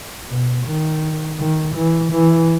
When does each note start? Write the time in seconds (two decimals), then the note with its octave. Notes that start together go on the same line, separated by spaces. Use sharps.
0.30 B2
0.66 D#3
1.39 D#3
1.75 E3
2.12 E3